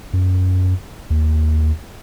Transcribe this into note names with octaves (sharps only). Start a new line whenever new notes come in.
F#2
D#2